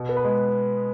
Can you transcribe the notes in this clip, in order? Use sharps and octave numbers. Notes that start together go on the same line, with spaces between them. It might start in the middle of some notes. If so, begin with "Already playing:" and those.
Already playing: B2
B3
B4
G#3